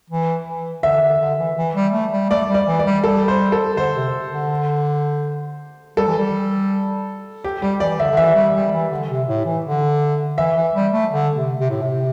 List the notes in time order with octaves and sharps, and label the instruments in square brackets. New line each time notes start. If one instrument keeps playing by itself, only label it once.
[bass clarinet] E3
E3
[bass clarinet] D3 [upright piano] E5
[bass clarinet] D3
D3
E3
E3
G3
A3
G3
[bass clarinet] A3 [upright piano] D5
[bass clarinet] G3
[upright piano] D5
[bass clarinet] E3
[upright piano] D5
[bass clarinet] G3
[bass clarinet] G3 [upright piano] A4
[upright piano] C5
A4
[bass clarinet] D3 [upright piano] C5
[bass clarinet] C3
D3
[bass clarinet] G3 [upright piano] A4
[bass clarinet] E3
G3
[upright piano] G4
[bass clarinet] G3 [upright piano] G4
[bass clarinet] E3 [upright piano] D5
[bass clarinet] D3 [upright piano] E5
[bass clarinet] D3
[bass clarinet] E3 [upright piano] E5
[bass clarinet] G3
G3
E3
D3
C3
A2
E3
D3
[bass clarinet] E3 [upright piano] E5
[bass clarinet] E3
G3
A3
D3
C3
C3
A2
C3